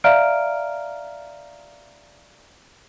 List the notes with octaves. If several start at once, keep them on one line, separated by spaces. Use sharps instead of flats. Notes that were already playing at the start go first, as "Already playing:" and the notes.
D5 E5 F5 A#5 F6 D7